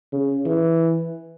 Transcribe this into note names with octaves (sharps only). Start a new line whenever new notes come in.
C#3
E3